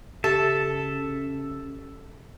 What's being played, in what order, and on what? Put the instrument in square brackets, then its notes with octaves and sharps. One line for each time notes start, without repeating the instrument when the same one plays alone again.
[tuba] C#3 [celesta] G4 [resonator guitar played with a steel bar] A4 [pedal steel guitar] E5 A5